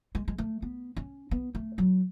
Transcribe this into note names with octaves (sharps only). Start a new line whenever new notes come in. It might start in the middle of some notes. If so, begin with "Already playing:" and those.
G#3
G#3
A3
B3
C#4
B3
A3
F#3